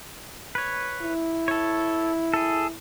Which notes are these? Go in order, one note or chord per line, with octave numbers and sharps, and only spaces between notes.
B4 C#5
E4
A4 C#5
G#4 A4